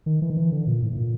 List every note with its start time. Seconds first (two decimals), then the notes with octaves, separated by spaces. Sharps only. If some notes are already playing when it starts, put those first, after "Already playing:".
0.06 D#3
0.22 E3
0.30 D#3
0.37 E3
0.52 D3
0.67 A#2
0.82 A2
0.93 A2
0.97 A#2